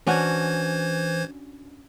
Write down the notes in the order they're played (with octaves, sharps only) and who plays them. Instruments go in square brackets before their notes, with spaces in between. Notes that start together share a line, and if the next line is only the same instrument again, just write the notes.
[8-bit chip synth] E3 C5 G#6 [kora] C#4 D4 F#4